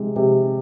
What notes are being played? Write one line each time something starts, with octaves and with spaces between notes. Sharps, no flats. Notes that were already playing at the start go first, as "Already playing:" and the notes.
Already playing: C3 G#3
C3